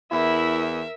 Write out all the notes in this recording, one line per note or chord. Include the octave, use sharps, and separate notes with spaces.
E2 E4 A#4 E5